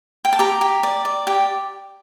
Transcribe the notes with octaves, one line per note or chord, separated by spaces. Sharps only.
G5
A5
G4 A#5
G4
D5
D5
G4